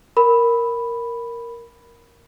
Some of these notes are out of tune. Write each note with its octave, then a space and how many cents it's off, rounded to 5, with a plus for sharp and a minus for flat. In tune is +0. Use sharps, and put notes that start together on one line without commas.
A#4 +0 B5 +0